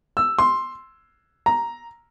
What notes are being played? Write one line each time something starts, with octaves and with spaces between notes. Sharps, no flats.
E6
C6
A#5